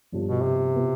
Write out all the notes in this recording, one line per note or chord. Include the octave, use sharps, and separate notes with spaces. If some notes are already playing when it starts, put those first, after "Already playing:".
G1 G2 F3
B2
C3
B2 B3 F4